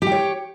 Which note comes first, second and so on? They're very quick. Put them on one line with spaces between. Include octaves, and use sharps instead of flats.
G4 G5 C#5